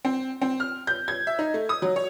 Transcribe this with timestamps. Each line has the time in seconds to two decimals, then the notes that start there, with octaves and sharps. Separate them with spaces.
0.05 C4
0.41 C4
0.60 F6
0.87 G6
1.08 G#6
1.27 E5
1.39 D#4
1.54 A3
1.69 D#6
1.82 F#3
1.96 C#5